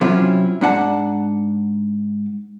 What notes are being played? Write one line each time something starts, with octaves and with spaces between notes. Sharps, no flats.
C3 F#3 C4 C#4 E4 F4
G#2 D4 F#5 A5